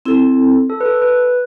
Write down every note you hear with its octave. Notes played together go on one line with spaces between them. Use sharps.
C4 E4 A4
A4
B4
A4
B4